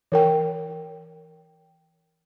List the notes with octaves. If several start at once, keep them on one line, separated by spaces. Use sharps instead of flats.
E3 A#4 G5